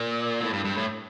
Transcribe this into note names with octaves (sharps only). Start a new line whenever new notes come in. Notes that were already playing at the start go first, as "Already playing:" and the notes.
Already playing: A#2
A2
G2
G2
A2